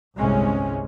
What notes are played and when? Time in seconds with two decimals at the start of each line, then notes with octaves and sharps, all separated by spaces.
0.18 G1 C2 A2 C3 G#3 C#4